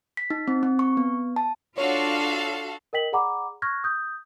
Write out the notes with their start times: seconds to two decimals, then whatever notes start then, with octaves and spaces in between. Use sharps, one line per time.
0.17 B6
0.30 D#4
0.48 C4
0.63 C4
0.79 C#6
0.97 B3
1.36 A5
1.78 D4 F4 F#4 A4 C#5 F5
2.93 A#4 D#5 G5 B6 F#7
3.13 G#4 D5 F#5 A#5 B5 D6
3.62 C#6 F6 F#6 G#6 A#6
3.84 D#6 G6